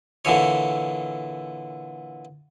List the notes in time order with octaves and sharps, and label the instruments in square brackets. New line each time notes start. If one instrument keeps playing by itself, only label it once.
[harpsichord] A#2 D3 E3 C#5